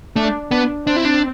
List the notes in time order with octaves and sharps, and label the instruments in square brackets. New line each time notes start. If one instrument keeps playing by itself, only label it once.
[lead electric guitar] A3 [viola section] D4
[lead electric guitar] B3 [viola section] D4
[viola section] C4 [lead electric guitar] D4
[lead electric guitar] E4
D4